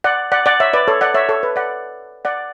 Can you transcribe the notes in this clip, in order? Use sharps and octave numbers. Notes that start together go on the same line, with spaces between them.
D5 F#5
D5 F#5
D5 F#5
C#5 E5
B4 D5
A4 C#5
D5 F#5
C#5 E5
A4 C#5
B4
D5 F#5
D5 F#5